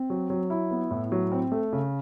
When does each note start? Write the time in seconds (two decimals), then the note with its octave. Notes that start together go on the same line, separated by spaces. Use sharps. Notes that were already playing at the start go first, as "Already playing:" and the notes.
Already playing: C4
0.10 F#3
0.30 F#3
0.50 E4
0.71 B3
0.91 A2
1.12 F#3
1.32 C4
1.52 A3
1.73 C#3